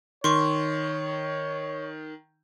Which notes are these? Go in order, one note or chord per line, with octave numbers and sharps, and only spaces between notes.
D#3 C#5 C6 C#6